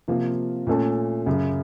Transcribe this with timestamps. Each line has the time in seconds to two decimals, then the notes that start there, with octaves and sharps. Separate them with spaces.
0.08 C3 F3 A#3 F4
0.67 A#2 A3 C#4 A4
1.26 F#2 C#3 F#3